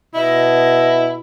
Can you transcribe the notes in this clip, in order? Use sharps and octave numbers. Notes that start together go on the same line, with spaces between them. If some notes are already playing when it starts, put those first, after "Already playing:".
B2 E4 D#5